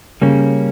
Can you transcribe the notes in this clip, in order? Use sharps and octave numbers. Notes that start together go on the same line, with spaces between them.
C#3 G3 A#3 C#4